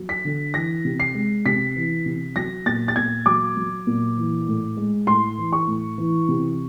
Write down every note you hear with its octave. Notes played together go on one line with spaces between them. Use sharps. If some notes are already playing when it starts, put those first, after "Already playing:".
Already playing: F#3
B6
D3
E3 A#6
C3
C7
G#3
C3 B6
E3
C3
F#3 A#6
A#2 A6
A6
A#2 G#6
F#3 D6
F#3
A#2
E3
A2
G#3
A2 C6
E3
C#6
A2
E3
C3